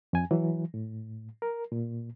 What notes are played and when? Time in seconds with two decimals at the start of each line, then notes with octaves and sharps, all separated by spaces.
0.13 F2 G#5
0.31 E3 F#3
0.74 A2
1.42 A#4
1.72 A#2